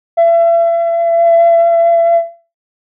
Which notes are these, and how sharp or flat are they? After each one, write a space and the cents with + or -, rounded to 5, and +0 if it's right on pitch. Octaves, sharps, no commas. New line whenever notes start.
E5 +40